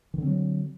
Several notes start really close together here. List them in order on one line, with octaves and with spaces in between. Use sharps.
D#3 D3 C4 F#3